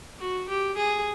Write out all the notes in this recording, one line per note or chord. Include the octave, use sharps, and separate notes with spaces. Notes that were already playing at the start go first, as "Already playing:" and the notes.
F#4
G4
G#4